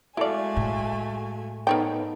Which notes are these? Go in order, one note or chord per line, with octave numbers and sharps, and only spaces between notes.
G#3 A3 E4 F#4 A4 D5 F5 G#5
A2
B3 D#4 A4 A#4 C#5 G5